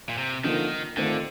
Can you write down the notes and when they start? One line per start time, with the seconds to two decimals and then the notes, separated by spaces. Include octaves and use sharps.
0.09 A#2
0.18 C3
0.44 D3 D#3 F3 A#3 D#4 A#4
0.97 D3 D#3 A3 C4 F4